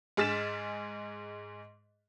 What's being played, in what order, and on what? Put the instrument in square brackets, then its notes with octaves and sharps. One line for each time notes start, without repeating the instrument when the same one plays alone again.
[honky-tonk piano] G#2 G#4 F6 A6 B6 E7